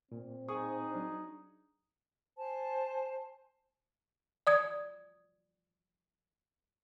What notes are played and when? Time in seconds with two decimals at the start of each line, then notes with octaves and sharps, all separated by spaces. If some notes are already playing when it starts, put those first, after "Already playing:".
0.12 A#2 C4
0.48 D#4 G#4 C#6 D#6
0.92 F#3 D4
2.38 C5 G#5 A5
4.47 D5 D#6 G#6